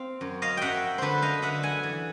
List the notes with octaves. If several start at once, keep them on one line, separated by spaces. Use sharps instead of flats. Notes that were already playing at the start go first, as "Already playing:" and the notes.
Already playing: C4 F5
F#2
D#5 F5
F#2 E5 F#5 G5
D3 A4 B4 C5
D#5 F5
D3 E5 F#5
F#5 G#5
E3